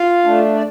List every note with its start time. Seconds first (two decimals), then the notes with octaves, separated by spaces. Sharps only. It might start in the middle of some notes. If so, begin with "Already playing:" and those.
Already playing: F4 F5
0.24 A3 D4
0.55 D5